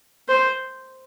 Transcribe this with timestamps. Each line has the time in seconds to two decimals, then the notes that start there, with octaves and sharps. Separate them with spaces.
0.28 C5